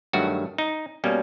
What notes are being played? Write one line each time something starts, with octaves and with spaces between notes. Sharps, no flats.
G2 D#3 F#3 A3 F#4
D#4
B2 G3 A#3 C#4